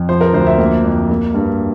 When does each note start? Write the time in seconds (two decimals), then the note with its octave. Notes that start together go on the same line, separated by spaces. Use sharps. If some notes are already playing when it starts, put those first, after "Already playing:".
Already playing: F2
0.09 F3 C5
0.21 A#4
0.33 D2 C5
0.47 E5
0.58 A#3 E5
0.84 F2
1.10 A#3
1.34 G2